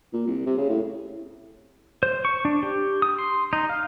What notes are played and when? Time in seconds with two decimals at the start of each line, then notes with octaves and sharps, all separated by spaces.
0.13 A#2
0.27 C2
0.46 C3
0.58 C#3
0.69 A2
2.03 C5
2.25 C#6
2.45 D4
2.63 G4
3.02 D#6
3.19 C6
3.53 D#4
3.69 F5